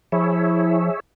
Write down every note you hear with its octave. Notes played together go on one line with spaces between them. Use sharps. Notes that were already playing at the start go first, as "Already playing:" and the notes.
F3 E4 G#4 C#5 E5